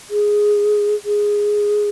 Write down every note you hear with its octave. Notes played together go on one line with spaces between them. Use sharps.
G#4
G#4